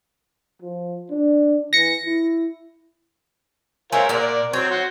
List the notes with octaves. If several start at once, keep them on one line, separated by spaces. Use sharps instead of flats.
F3
D4
E3 A#6 C#7
E4
G#3 C4 E4 F4 A#4 C#5
A#2 A#4 D5 F#5
F#3 C4 C#5
F#4 C6